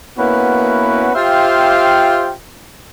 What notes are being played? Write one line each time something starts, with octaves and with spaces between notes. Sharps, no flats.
A#3 B3 C#4 E4 F#4 B4
F4 G4 C5 E5 F5 G5